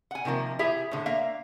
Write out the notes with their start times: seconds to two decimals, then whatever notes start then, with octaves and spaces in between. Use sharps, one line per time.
0.11 F#5 G#5
0.25 C3 D#3 F3 A#3
0.59 E4 G4 G#4 E5
0.91 A2 D3
1.06 A#3 E5 F5